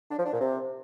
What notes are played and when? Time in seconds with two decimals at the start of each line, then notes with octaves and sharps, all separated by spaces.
0.10 D4
0.18 F3
0.26 D4
0.33 A#2
0.41 C3